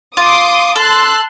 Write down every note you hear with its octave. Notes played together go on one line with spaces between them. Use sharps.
F4 C6 D6 D#6
A4 A5 C6 F#6